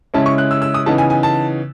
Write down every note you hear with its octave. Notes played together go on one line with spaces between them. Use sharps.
C#3 G#3 C#4 E4 A5
C#6
F#6
E6
E6
D#6
C#3 E3 B3 D#4 A5
G#5
G#5
A5